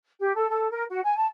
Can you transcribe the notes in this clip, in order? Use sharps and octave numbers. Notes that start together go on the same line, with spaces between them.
G4
A4
A4
A#4
F#4
G#5
A5